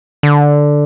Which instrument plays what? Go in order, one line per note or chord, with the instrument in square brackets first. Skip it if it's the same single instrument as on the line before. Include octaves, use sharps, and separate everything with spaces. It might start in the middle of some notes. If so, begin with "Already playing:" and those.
[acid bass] D3